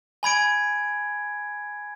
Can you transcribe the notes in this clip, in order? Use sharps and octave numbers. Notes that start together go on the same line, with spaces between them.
G#5 B5 G#6 D7